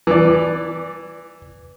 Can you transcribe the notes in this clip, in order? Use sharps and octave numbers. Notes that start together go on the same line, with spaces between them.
E3 D5